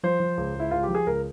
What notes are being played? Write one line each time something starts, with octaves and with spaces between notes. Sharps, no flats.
F3 C5
F3
C#2
C#2 E4
C#2 F4
G4
F3
G#4
C#2 A#4